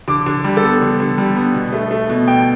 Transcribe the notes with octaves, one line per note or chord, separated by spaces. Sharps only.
D3 D6
D3
G3
A4
B3
D3
D3
G3
B3
B2
A3
A3
B2
B2 G5